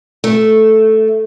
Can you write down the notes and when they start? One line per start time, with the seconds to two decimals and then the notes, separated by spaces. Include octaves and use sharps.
0.24 A3